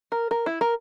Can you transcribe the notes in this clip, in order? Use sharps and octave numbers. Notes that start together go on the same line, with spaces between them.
A#4
A#4
E4
A#4